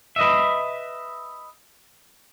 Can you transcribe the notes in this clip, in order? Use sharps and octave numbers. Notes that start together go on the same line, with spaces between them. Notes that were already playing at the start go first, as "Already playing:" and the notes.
B4 D#5 E5